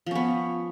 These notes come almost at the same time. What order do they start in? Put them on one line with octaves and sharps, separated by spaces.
F3 C#4 B3